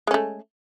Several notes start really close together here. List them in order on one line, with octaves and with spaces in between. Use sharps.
G#3 C#4 A3